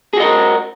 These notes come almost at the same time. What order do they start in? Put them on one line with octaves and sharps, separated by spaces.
G#4 F#4 D#5 A#4